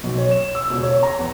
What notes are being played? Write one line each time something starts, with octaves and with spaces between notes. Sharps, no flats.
B1
C#5
E7
E6
E1
C#5
A#5
E2